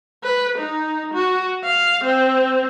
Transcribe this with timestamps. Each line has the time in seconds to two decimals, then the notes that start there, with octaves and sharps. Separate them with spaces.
0.24 B4
0.58 D#4
1.14 F#4
1.64 F5
2.04 C4